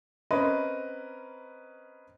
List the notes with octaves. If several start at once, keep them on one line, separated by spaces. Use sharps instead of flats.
C4 C#4 A#4 B4 D#5